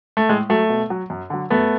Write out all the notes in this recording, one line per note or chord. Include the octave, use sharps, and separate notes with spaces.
A3
A2 G#3
F#3 A3
B2
F#3
F#2
D3 F#3
F#2 A3 B3